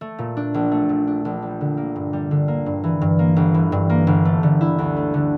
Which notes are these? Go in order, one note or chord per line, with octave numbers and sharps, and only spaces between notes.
A3
A#2
D4
A#1
A3
A#2
D4
A#1
G3
D3
A#3
G2
G3
D3
A#3
G2
E3
G2
A#3
G1
E3
G2
A#3
G1
A3
D3
E4
D2
A3
D3